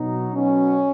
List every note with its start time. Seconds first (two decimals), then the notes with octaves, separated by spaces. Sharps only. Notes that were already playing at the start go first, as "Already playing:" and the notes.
Already playing: B2 F#3 D#4
0.34 B2 F#3 C#4